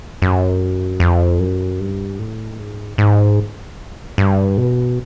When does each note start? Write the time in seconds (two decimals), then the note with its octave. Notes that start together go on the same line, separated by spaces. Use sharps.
0.22 F#2
1.00 F2
1.40 F#2
1.80 G2
2.19 A2
2.59 G#2
2.98 G#2
4.18 G2
4.58 B2